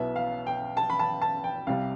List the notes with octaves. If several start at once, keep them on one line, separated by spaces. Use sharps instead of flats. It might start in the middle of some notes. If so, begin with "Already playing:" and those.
Already playing: B1 B2 B3 E4 E5
F5
G5
A5
B5
A5
A5
G5
C2 C3 G3 F5